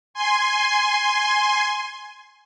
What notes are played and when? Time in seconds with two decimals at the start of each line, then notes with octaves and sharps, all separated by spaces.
0.14 G#5 C6